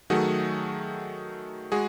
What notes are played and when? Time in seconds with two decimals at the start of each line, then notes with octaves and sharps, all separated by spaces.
0.10 D#3 F#3 A3 F#4 G#4
1.72 G#3 F#4 G#4